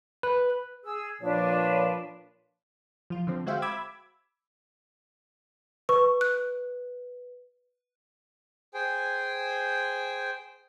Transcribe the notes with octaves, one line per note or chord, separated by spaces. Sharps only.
B4
G#4 E6
A#2 F3 D4 B4 C#5
F3 F4
D3 F3 C4
G#3 F#4 C5 E5 F5 G5
B5 D6 E6 G#6
B4 C#6
F#6
G#4 C5 G5 G#5